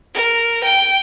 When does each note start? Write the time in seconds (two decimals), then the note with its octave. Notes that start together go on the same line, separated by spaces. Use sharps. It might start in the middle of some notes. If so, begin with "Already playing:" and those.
0.15 A#4
0.64 G5